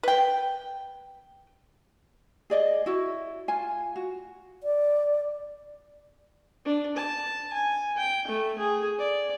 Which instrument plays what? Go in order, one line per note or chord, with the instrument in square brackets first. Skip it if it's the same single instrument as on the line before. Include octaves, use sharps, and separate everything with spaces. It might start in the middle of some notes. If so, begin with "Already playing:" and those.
[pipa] B4 G5
[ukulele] G#4 D5 D#5
E4 F#4
F4 G#5
F#4
[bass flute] D5
[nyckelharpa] D4
A5
G#5
G5
A3
G#4
D5